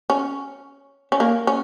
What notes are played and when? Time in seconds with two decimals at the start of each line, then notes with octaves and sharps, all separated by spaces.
0.10 C#4
1.12 C#4
1.20 A#3
1.47 C#4